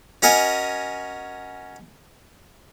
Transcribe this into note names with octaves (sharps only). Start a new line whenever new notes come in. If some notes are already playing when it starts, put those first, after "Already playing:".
C#4 F#4 A#4 D#5 F#5 G#5